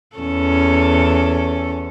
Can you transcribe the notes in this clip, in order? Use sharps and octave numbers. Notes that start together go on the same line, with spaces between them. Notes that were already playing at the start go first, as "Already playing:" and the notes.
E2 C#4 A4